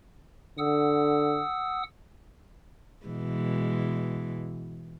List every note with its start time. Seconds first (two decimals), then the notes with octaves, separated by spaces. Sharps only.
0.58 D3 F#5 D#6 E6
3.06 B2 E3 G#3